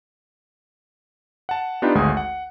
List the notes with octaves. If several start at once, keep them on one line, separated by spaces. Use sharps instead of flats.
F#5 A5
B3 D4 D#4 F4 G4 B4
G#1 D2 G#3 G#5 D#6
F#5